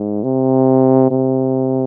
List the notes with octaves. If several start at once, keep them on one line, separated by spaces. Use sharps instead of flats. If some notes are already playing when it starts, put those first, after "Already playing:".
Already playing: G#2
C3
C3